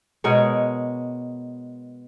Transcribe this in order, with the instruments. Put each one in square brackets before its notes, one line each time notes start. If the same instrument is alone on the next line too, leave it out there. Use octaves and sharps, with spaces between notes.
[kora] B2 G#3 A#4 C#5